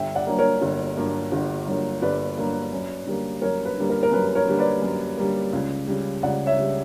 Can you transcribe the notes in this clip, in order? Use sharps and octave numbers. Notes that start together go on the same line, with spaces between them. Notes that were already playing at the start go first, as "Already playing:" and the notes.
Already playing: G1 E5 G5
D5 F#5
G2 F#3 A#3
A#4 C#5
G1
G2 F#3 A#3
G1
G2 F#3 A#3
G1 B4 D5
G2 F#3 A#3
F#2
D3 G3 A#3
F#2 A#4 C#5
B4
D3 G3 A#3
A#4
A#4
F#2 B4
A#4 C#5
D3 G3 A#3
B4 D5
F#2
D3 G3 A#3
C#2
C#3 G3
C#2 D5 F#5
C#5 E5
C#3 G3